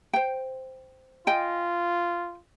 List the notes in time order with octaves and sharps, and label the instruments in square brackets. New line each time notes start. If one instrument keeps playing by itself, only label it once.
[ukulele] C5 G5
[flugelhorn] F4 [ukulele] D#5 G5 G#5